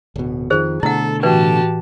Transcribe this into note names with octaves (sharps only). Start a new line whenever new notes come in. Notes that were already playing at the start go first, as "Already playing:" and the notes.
D1 B2
F2 D#3 F3 G#4 C5
B2 D3 A3 E4 A4 F#5
A2 E3 F#4 G4 B4 G5 A5